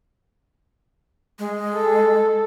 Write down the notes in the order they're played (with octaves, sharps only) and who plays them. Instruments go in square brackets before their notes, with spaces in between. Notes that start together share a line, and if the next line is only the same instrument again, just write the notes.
[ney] G#3
[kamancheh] A4